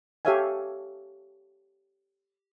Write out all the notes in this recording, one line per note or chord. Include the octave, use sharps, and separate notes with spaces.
G4 A4 C#5 E5 F5 G#5